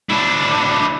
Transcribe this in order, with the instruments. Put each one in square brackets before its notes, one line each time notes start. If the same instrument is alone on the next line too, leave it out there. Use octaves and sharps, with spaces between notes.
[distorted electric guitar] D4 E4